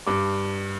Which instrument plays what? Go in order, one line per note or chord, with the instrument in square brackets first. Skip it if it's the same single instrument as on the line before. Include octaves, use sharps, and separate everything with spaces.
[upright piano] G2 D6